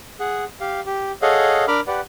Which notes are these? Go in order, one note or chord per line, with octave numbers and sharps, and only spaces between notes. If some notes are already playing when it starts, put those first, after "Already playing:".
G#4 F#5
G4 F5
G4
G#4 A4 C#5 D#5 F5 F#5
D4 A#4 B5 D6 F6
G4 B4 D5 F#5